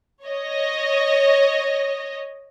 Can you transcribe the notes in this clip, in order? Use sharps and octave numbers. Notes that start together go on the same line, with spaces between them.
C#5 D#5